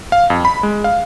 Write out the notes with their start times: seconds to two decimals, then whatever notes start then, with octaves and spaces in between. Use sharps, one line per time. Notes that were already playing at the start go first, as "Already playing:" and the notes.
0.12 F5
0.30 F2
0.45 B5
0.63 G#3
0.84 F5